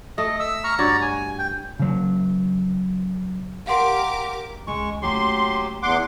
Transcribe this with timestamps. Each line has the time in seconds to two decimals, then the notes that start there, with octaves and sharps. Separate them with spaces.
0.18 A3 D#5
0.40 E5 E6
0.64 A#5 C#6 F6
0.79 G2 F#4 C#5 D5 A#5
1.02 G#5
1.39 G5
1.79 C#3 F#3
3.67 G4 A#4 F5 F#5 C6 D6
4.67 C#2 G#3 C#6
5.02 F#1 F#3 A3 G4 C6
5.82 E2 F#5 C6 D6